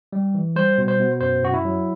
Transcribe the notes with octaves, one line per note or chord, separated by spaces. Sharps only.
G3
E3
G3 C5
B2
C5
B2
F#2 C5
F#2 F#4
E4
F#3